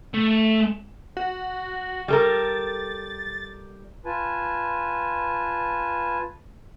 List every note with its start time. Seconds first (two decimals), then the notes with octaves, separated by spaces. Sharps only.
0.14 A3
1.17 F#4
2.08 G3 A4 A#4 A6
4.06 F4 B4 G#5 A5